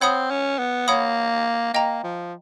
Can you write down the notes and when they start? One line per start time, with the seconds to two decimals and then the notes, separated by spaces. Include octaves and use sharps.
0.01 C4 C#5 F#5 B5 D#6
0.31 C#4
0.59 B3
0.87 A#3 C#5 F#5 B5 D#6
1.74 A#3 D#5 G5 A#5
2.03 F3